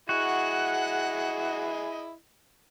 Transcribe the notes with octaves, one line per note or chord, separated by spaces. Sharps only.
E4 F#4 G#4 D#5 F#5